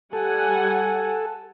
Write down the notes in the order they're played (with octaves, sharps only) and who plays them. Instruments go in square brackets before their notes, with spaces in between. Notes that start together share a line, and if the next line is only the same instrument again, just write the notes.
[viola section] G3 F#5 G#5 [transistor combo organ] A4